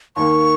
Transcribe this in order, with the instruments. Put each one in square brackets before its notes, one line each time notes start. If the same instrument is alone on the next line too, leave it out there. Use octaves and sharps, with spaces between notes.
[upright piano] D#2 D#3 A#3 [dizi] C#6